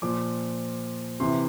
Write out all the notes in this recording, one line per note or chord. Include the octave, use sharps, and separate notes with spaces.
A#2 F3 D6
C3 E3 C6